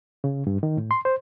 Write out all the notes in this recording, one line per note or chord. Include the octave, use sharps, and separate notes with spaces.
C#3
G2
D#3
A2
C6
C5